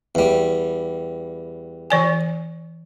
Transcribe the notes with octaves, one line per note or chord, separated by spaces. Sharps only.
E2 G3
E3 D5 G#5